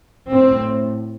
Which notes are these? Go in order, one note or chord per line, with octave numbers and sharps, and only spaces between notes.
A2 C4